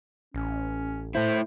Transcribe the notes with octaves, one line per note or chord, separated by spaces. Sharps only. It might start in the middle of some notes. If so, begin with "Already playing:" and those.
A1 C#4
A3 E4 C5